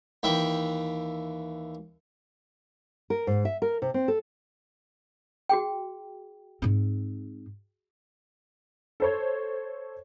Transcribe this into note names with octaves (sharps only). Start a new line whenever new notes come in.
D#2 E3 E5 G5
A#4
G#2
E5
A#4
C3
C4
A4
F#4 G#4 G5
G#2 C4
A4 C5 C#5